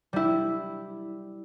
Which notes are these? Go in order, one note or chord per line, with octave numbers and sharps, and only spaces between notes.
G3 E4